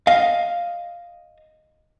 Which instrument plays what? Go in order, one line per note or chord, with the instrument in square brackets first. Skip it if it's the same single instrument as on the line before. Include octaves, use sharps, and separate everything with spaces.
[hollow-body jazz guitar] D#5 F5